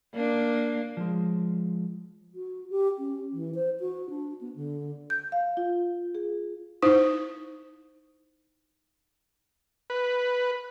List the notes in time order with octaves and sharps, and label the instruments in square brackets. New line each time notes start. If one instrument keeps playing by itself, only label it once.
[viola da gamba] A#3 D4
[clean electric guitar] F3 G#3
[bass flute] F#4
G4
C#4
E3
C5
F#4
D4
B3
D3
[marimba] G6
F5
F4
G#4
[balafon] D#4 E4 C5
[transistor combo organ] B4